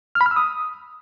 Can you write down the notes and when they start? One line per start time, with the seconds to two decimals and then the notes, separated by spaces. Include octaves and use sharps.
0.15 F6
0.21 B5
0.26 F6
0.31 E6
0.36 D#6